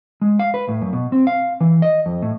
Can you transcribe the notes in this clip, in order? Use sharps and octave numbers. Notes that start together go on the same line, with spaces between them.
G#3
F5
B4
A2
F#2
B2
C4
F5
E3
D#5
F2
A2